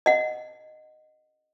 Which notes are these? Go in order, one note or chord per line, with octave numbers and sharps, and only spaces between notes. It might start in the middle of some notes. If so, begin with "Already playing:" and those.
D#5 F#5